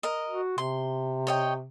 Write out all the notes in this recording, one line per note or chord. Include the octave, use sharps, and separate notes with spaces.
A#4 D#5
F#4
C3 C6
C#5 D#5 G5